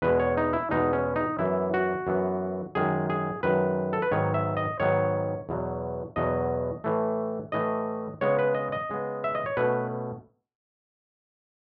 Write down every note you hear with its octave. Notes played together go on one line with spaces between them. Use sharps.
E2 B2 G#3 B4
C#5
D#4
E4
E2 B2 G#3 D#4
C#4
D#4
F#2 E3 B3 E4
F#4
F#2 E3 B3
F#2 D#3 G#3 G#4
G#4
F#2 D#3 G#3 B4
A4
B4
G#2 D#3 F#3 B3 C#5
E5
D#5
G#2 D#3 F#3 B3 C#5
E2 B2 F#3
E2 B2 F#3 D#5
A2 E3 A3
A2 E3 A3 D#5
C#3 G#3 B3 C#5
B4
D#5
D#5
C#3 G#3 B3
E5
D#5
C#5
B2 A3 C#4 B4